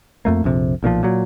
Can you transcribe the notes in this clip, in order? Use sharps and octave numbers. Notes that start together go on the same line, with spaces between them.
F2 A3 A#3
A#1 F2 C3
B1 A#2 D3 F3
A#2 F#3